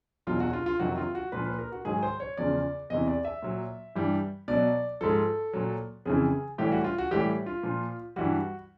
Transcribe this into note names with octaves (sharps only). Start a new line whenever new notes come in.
E2 B2 F#3 F4
F#4
F4
F4
F2 C3 D#3 F#3 F#4
F4
F#4
A#2 F3 B4
B4
A#4
F#4
G#2 D#3 F#3 G#4
C5
C#5
E2 C#3 F3 D5
E2 C3 E3 D#5
D5
E5
A#2 F#3
G2 E3 G3
B2 F#3 D5
G#2 F3 A4
A#2 F#3
F2 C#3 E3 G#4
A2 E3 G3 G4
F#4
F4
F#4
A2 E3 G3 G4
F4
A#2 F3
G2 E3 G3 F#4